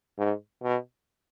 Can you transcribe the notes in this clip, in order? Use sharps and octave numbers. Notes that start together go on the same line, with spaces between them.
G#2
B2